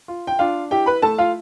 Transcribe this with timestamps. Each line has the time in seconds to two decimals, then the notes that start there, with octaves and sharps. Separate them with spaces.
0.08 F4
0.27 G5
0.39 D4 F4 F5
0.71 E4 G4 G5
0.86 B4 B5
1.02 A3 A4 A5
1.18 F4 F5